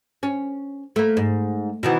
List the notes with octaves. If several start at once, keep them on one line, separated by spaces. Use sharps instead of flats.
C#4
A3 A#3
G#2
B2 D#3 E3